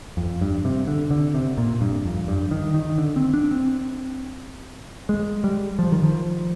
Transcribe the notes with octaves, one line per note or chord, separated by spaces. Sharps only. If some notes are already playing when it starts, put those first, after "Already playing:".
F2
G2
C3
D3
D3
C3
A#2
G2
F2
G2
D#3
D#3
D3
C4
D4
C4
G#3
G3
F3
D#3
F3